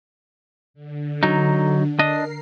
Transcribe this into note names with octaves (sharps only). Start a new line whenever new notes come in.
D3
F#3 D#4
D4 A#4 D#5 C7